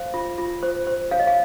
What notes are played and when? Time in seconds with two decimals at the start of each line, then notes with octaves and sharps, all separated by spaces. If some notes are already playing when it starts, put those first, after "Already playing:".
Already playing: C5 F5
0.14 F4
0.38 F4
0.63 C5
0.87 C5
1.11 C#5 F5
1.20 D#5
1.27 F5